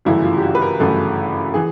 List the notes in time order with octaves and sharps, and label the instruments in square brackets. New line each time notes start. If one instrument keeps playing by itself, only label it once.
[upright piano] G1 F#2 C#3 E3 A3 E4
F4
G4
F#4
B4
A#4
G1 F#2 C#3 E3 A3 A4
E3 G#4